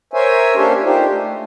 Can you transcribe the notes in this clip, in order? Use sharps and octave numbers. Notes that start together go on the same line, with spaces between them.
A#4 C5 C#5 E5 G#5
A#3 C#4 D4 G4 A4 C5
D4 D#4 F4 G4 C5
A3